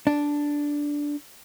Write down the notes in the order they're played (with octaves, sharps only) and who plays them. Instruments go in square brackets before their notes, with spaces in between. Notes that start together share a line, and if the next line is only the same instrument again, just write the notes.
[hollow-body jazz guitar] D4